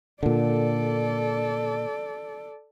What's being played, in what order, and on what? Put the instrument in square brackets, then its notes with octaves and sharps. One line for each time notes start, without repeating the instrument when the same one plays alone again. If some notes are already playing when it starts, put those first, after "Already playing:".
[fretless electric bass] A#2 D3 [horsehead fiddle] A4 D5